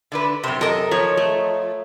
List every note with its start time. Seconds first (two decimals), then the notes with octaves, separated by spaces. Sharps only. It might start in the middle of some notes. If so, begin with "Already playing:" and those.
0.12 D3 D4 B4
0.44 F#2 C3 C5
0.61 A4 A#4 D#5
0.91 F3 C#5
1.17 A3